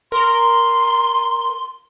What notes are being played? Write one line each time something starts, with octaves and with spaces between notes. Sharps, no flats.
A#4 C6